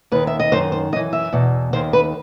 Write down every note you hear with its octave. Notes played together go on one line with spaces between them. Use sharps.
D#2 D#3 B4
E5
D#5
F#2 D#3 C5
C5
F#2 E3 D#5
E5
E2 B2
D#2 D#3 C5
B4